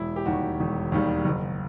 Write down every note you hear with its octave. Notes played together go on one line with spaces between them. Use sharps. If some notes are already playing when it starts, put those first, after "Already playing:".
Already playing: E1 E4
G4
D#2 D#3 G3 F#4
E1
D#2 D#3 G3
F#1